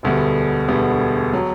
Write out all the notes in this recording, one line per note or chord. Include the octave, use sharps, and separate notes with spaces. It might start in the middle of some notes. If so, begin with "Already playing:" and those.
E1 D2 D3 G3 B3
E1 D2 D3 G3 B3
F#3